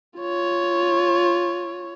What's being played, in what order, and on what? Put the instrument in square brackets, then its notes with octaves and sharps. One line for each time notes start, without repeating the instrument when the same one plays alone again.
[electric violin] F4 C#5